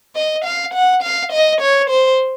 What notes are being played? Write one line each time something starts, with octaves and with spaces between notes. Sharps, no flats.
D#5
F5
F#5
F5
D#5
C#5
C5